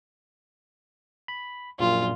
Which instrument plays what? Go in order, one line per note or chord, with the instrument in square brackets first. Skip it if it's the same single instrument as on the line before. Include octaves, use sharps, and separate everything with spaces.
[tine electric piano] B5
[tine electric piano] A#1 F#2 A#2 [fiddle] F4